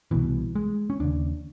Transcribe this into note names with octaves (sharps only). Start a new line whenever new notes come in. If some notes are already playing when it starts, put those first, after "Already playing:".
C2 B2 E3
G#3
C#4
D#2 C#3 D4